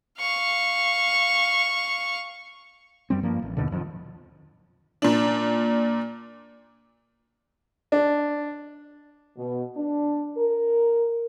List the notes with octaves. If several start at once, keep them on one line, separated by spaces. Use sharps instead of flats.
F5 C#6
F#2 G3 C4
G2 F3 A#3
A1
D#2 B2 D3
D1 F2 D#3 F3
A#2 D4
D4
B2
D4
A#4